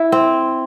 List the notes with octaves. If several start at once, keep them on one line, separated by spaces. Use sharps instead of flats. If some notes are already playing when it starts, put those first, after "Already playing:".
Already playing: E4
C4